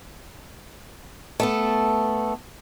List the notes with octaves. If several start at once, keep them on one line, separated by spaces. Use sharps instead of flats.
A3 B3 A4